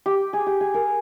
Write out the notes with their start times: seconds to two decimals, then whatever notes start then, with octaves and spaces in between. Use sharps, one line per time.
0.06 G4
0.33 G#4
0.46 G4
0.61 G#4
0.74 A#4